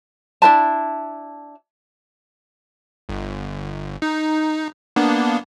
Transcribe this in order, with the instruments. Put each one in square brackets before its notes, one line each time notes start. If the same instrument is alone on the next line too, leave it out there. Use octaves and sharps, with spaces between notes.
[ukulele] D4 E4 B4 A5
[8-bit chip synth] G1
D#4
A#3 B3 D4